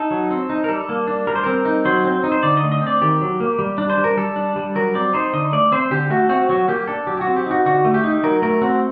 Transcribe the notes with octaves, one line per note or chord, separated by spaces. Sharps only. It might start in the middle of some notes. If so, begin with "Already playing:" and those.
Already playing: D#4 A4
F#3
C4
D#4
A#4
G3 A4
A#3
D4
G3 A#4
C5
C4 A#4
D#4
F#3 C5
C4
D#4
C5
D3 D5
D#5
A3
D#5
C4 D5
D#3 G4
F#3
A#3
G3
D4
C5
G3
A#4
G3 A4
D4
G3
F#3 A#4
C4 D5
D#4 C5
D3 D#5
A3 D5
C4 C5
D3 G4
A3 F#4
C4 F#4
F#3 F#4
A#3 G4
D4 A4
F#3 G4
G4
F#4
C4
G4
D#4 F#4
D3 F#4
A3
G4
D#4
F#3 A#4
A3 A#4
C4 F#4